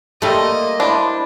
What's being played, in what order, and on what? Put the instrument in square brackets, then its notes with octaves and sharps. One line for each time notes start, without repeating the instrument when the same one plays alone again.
[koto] G3 A3 [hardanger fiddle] A#3 D#5 [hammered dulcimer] C6
[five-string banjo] D4 [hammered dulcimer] E4 C5 B5